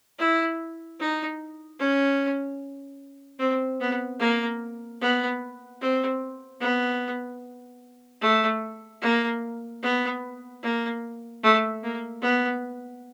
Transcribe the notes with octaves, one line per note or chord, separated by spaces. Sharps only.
E4
D#4
C#4
C4
B3
A#3
B3
C4
B3
A3
A#3
B3
A#3
A3
A#3
B3